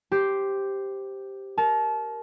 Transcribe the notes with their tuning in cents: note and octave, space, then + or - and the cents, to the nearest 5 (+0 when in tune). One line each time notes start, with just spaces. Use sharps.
G4 +0 C5 +0
A#4 +0 A5 -30